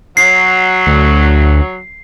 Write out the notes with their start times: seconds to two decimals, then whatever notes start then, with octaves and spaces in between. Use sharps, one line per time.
0.17 F#3 C7
0.87 D2